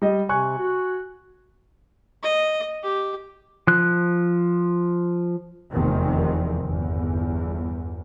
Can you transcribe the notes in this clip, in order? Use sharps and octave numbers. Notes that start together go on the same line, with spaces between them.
G3 D#5
C3 G#5 C#6 F#6
F#4
D#5
G4
F3 F#6
F1 E2 C3 D#3
G1 E2